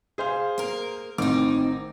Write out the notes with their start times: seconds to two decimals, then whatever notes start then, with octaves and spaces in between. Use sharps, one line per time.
0.18 G#4 C5 F5
0.58 A#3 A#4
1.18 A1 D#3 C4 D#4 D6